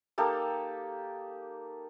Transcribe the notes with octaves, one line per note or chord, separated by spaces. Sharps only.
A#3 D#4 G4 A4